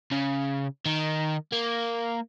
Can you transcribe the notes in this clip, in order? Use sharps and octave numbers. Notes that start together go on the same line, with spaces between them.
C#3
D#3
A#3